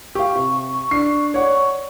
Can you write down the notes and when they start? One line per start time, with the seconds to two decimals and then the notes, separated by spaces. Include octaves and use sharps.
0.15 G4 F5 C#6
0.36 C3
0.91 D4 C7
1.34 C#5 D5 F#5 C#6